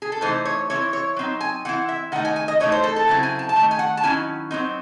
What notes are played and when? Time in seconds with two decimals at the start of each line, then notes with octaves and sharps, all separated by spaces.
0.02 G#4
0.12 A4
0.21 C3 E3 A3 D#4 C5
0.45 C#5
0.70 E3 C4 E4 C#5
0.93 C#5
1.16 F#3 C4 D#4
1.41 G#5
1.65 E3 C4 E4 F#5
1.89 E5
2.12 D#3 A3 D#4 F#5
2.25 G#5
2.36 G#5
2.48 D#5
2.60 E3 A3 D#4 C#5
2.72 C5
2.83 A4
2.96 A4
3.07 C#3 F#3 C4 E4
3.23 G#5
3.39 A5
3.49 A5
3.56 D#3 A3
3.71 G#5
3.79 F#5
3.97 A5
4.03 D#3 F#3 C#4 E4 G#5
4.51 F#3 C4 D#4